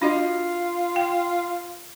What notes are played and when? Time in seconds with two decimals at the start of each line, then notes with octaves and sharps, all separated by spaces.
0.02 D4 F4 F#4 D#5
0.96 G5